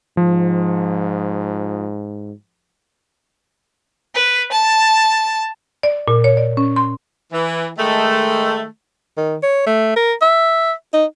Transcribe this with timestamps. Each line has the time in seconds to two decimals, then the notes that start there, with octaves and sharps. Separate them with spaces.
0.17 G#2 F3
4.14 B4
4.52 A5
5.83 D5
6.08 A#2
6.24 C#5
6.37 D5
6.57 C#4
6.76 C6
7.32 E3
7.78 D#3 G#3 A3
9.17 D#3
9.43 C#5
9.66 A3
9.96 A#4
10.22 E5
10.93 D#4